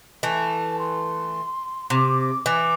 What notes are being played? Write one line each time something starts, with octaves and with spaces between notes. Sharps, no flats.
E3 A3 A5
C6
C3 D6
E3 D6